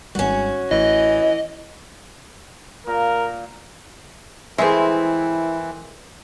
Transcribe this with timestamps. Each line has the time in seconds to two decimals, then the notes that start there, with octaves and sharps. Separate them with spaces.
0.15 G#1 C#2 G3 C#4 F#4
0.71 A1 E3 D#5
2.87 A#2 A#4
4.58 E3 G#3 A3 C4 E4 G#4 A#4 B4